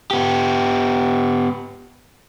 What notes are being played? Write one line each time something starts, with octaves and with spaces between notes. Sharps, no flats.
B3 G4